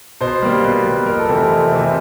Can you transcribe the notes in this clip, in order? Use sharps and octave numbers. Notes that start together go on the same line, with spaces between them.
B2 C5
G3 A#3
B2 B4
G3 A#3
F2 A#4
A4
C3 E3 A3 C4 A#4
F2
C3 E3 A3 C4